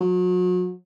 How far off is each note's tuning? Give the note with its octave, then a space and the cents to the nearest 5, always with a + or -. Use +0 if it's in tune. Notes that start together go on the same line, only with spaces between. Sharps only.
F#3 -35